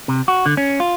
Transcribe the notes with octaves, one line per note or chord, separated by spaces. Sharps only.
C3
F#4
D3
C#4
F4